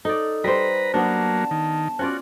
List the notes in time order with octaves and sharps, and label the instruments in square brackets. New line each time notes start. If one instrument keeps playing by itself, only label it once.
[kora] D#4 D5 [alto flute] A4
[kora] G3 C5 [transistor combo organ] B4 A#5
[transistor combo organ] F#3 A#3 [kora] B3 D4 [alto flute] A5
[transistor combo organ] D#3
[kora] C#4 F4 D5 [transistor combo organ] F#4